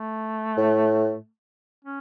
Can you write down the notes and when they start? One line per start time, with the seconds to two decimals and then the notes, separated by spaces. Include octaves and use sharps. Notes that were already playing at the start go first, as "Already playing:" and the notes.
Already playing: A3
0.57 A2
1.85 C#4